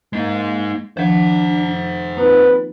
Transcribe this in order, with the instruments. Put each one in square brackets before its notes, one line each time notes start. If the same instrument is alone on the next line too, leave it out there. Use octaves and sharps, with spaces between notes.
[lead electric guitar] G#3 D#4 [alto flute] A#3
[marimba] D#3 F3 [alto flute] D4 [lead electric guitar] C5 F#5
[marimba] A#3 D#4 F4 [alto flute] C4 [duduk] B4